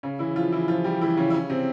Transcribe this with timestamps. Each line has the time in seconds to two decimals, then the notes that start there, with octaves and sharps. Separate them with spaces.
0.03 C#3 C#4
0.19 E3 E4
0.36 F3 F4
0.52 E3 E4
0.68 F3 F4
0.84 G3 G4
1.01 E3 E4
1.17 C#3 C#4
1.30 E4
1.34 C#3 C#4
1.50 C3 C4